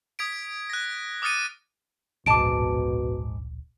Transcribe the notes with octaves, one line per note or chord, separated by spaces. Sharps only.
D#6 G#6 B6 D7
F#6 A#6
D6 D#6 F6 A6 C#7 D#7
D1 A#1 G#2 B2 A5 D6 D7